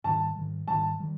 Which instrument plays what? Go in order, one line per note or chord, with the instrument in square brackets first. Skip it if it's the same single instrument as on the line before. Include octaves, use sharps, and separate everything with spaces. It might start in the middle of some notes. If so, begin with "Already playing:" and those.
[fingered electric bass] G#2 D#3 G3 [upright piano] A5
[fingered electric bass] G#2 D#3 G3
[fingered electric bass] G#2 D#3 G3 [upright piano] A5
[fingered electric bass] D#3 G3